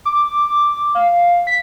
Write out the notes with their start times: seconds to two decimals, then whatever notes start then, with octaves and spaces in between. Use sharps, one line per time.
0.05 D6
0.95 F5
1.47 B6